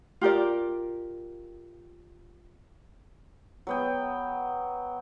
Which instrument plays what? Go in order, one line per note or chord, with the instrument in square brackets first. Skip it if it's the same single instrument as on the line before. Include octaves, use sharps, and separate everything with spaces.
[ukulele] F4 G4 A#4 D5
[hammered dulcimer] F#3 B3 G5